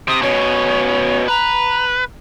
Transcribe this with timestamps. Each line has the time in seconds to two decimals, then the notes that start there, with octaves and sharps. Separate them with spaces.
0.08 C3 D#6
0.22 B2 C#4 C#5
1.28 B4 A#5